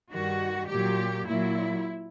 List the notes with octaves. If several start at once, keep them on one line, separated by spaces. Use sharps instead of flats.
G2 D#3 G3 F#4
A#2 F#3 G4
A#2 F#3 E4